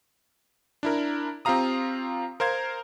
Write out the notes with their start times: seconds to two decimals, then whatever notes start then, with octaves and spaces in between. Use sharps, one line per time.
0.83 D4 E4 A#4
1.45 C4 F4 G4 F5 A#5 D#6
2.40 A#4 C5 F5 G#6